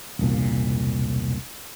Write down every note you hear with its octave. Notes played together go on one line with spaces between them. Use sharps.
E1 C2 A#2